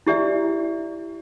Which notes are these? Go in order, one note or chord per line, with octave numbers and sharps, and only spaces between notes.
E4 G4 D5 E5